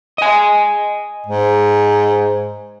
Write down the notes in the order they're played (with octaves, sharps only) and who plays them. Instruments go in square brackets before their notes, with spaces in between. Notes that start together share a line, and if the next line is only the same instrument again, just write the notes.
[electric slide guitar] D#5 G#5
[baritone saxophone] G#2